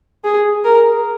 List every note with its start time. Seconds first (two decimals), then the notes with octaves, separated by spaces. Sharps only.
0.24 G#4
0.64 A#4